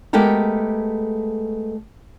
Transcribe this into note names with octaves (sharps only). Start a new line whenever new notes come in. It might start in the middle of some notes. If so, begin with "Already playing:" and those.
G#3 A3 B3 G4 A4 A#4